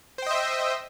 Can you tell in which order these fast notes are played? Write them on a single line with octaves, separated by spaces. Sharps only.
C5 G5 D#5 E5